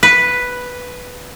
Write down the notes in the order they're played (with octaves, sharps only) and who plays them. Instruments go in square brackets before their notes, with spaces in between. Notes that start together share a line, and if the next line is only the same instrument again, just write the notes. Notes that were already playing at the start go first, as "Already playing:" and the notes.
[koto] B4